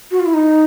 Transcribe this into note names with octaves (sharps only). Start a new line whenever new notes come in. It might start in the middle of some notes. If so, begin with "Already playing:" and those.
F#4
F4
E4
D#4